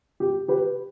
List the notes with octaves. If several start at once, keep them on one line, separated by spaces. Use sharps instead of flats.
G4
G4 B4